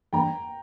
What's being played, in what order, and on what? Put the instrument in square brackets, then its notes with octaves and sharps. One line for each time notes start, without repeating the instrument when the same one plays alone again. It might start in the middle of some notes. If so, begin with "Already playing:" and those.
[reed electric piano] G2 E3 A#3 D4 [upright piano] G5 A#5